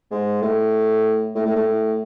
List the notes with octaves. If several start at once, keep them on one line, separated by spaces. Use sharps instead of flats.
G#2
A2
A2
A2
A2